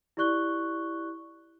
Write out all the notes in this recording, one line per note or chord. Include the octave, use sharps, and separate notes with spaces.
E4 G4 D5 C#6 F#6 G7